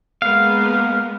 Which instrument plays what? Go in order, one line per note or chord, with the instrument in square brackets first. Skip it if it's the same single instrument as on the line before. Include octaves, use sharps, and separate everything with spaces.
[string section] G#3 A#3 B3 [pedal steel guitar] F5